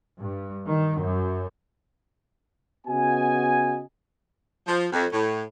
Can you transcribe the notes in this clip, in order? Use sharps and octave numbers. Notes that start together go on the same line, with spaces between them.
G2
D#3
F#2
C#3 B3 F#4 D#5 G#5
F3
F2
A2